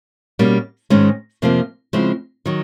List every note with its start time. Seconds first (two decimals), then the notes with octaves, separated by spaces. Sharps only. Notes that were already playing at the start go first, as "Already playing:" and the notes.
0.39 B2 G3 A#3 C#4
0.90 G#2 D#3 G#3 C#4
1.42 F2 C3 F3 A#3
1.93 C#3 F3 G#3 C4 E4
2.46 D#3 F#3